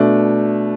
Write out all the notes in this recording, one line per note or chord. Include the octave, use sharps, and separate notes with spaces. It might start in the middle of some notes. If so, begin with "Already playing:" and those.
Already playing: B2 A3 D4